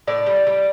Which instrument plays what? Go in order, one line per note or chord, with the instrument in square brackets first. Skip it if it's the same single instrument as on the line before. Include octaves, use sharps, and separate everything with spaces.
[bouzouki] A2 D5
G3
G3